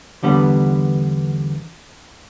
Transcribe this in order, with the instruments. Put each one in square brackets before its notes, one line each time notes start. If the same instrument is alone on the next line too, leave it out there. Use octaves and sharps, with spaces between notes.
[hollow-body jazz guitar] E2 D3 G3 B3